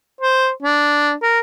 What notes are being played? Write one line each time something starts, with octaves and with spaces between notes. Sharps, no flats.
C5
D4
A#4